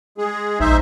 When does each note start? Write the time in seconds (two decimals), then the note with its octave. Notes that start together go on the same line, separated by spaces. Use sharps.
0.18 G#3 G#4
0.60 A#1 D#4 C5 E5